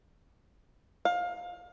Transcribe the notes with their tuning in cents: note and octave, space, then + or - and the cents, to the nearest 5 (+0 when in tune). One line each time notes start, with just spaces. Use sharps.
F5 +20